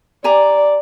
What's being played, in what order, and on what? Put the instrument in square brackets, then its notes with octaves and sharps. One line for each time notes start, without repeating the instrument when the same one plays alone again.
[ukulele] G4 G#5 A#5 [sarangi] D5